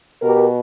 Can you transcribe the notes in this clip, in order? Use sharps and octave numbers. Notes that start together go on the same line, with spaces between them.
B2 G4 A#4